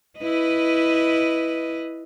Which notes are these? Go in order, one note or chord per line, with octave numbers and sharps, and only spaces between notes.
E4 B4 D#5